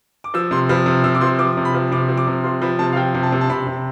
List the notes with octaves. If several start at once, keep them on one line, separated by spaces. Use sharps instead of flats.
D6
F3 E6
C3 C6
F3 B5
C3
C3 E6
D6
F3 C6
F3 D6
C3
B5
F3
C3 D6
F3
D6
C3
F3 C6
F3 B5
C3 A5
F5
F3 G5
C3
A5
C3
A5
C3 B5
C3